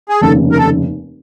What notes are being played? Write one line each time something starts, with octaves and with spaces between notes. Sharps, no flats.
G#4
F1 D#2 C#3 A4
A#4
A4